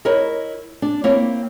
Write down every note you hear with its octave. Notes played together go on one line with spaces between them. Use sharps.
E4 A#4 C#5 D#5
D4
A#3 C4 E4 C#5